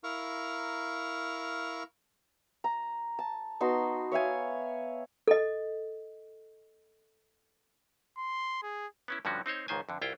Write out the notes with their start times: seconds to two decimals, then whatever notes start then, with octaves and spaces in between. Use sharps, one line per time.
0.04 E4 A#4 F5 A#5 C#6
2.64 A#5
3.19 A5
3.60 B3 D#4 F#4 C6
4.12 C#5 E5 F5 G#5
5.28 A4 D#5
8.17 C6
8.62 G#4
9.08 B3 C#4 E4
9.25 G2 D3 F3 C#4 F#4
9.46 C4 D#4 C5 C#5
9.68 C#2 G#2 D#3 C5 G#5
9.89 F2 D3
10.01 C2 E4 F4 G5